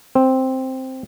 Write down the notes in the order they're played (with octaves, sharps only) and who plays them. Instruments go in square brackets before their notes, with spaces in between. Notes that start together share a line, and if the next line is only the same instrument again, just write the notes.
[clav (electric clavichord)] C4